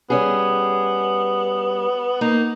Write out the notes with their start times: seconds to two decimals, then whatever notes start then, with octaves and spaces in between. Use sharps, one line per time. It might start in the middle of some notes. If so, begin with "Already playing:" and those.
0.10 G3 B3 C#4 G#4
2.21 A#3 D#4